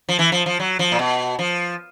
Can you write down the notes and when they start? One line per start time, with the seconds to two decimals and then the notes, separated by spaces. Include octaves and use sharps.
0.09 F3
0.19 E3
0.32 F3
0.46 F3
0.60 F#3
0.79 F3
0.92 A#2
0.99 B2
1.39 F3